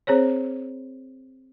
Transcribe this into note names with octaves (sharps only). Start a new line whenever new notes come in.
C4 G#4 C5 C#5